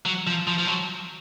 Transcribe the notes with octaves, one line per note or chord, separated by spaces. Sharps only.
F#3
F3
F3
F3
F#3